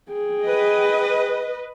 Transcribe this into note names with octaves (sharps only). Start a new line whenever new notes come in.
G#4 G5
B4 D#5